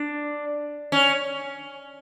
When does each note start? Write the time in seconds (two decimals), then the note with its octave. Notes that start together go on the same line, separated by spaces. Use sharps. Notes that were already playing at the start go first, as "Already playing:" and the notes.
Already playing: D4
0.92 C#4